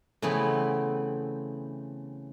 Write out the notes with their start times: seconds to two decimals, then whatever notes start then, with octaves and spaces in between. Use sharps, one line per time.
0.22 C#3 E3 A3 B3 C4